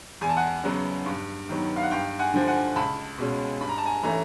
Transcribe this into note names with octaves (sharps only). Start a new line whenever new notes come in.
E2 G#5
A5
F#5 G#5
C#3 F#3 B3
G2
D#3 F#3 B3
F5
F#5
G2 F5 G5
F#5 G#5
D3 F3
F#5 G#5
C#2 A5 B5
B2 G#3 C#4
G2 B5
A#5
A5
G#5 A#5
E3 A3 C#4 G#5 A#5